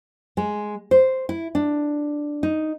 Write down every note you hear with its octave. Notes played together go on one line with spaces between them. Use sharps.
G#3
C5
E4
D4
D#4